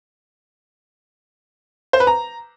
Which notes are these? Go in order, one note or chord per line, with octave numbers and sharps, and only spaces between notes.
C5
B4
A#5